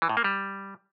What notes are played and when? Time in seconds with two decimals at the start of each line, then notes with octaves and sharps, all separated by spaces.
0.02 E3
0.09 A2
0.17 A#3
0.24 G3